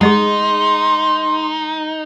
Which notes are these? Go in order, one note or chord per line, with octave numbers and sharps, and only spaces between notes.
G#3 D#4 G#4 D#5 F#5 C6